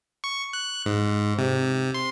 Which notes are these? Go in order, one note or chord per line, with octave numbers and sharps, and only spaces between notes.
C#6
F#6
G#2
C3
C3
C6